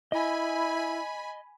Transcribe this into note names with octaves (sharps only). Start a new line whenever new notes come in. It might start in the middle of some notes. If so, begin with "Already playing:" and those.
E4 D#5 G#5 B5